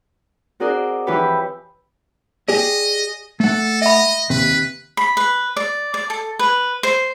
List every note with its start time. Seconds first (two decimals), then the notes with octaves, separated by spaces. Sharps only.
0.60 C4 F#4 G#4 A#4 D5 D#5
1.07 E3 F3 E4 G4 B4 C#5
2.48 G4 G#4 D5 D#5
3.40 A3 A4 F#5
3.82 D#5 E5 B5
4.30 D#2 C3 B4
4.97 B5
5.17 B4
5.57 D5
5.94 D5
6.10 A4
6.39 B4
6.83 C5